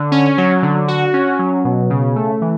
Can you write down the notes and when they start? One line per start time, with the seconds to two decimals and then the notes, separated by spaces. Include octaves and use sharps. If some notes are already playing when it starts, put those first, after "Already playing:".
Already playing: D3
0.12 C#4
0.38 F#3
0.63 D3
0.88 F#4
1.14 C#4
1.39 F#3
1.65 B2
1.90 C#3
2.16 A3
2.42 E3